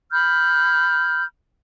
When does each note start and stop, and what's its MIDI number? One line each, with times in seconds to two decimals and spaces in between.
0.12 1.24 83
0.12 1.24 89
0.12 1.24 91